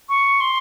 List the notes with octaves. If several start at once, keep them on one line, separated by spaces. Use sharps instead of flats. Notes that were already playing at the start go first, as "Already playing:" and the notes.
C#6
C6